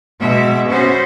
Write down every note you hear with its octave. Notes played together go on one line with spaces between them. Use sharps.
B2 G#3 E5
B3 C#4 F#4 C5